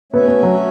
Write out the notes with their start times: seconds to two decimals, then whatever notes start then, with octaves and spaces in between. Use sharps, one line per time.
0.12 A3 B3 C#4 F#4 C#5 E5
0.28 B3
0.43 F#3